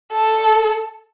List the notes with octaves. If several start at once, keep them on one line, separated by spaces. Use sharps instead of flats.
A4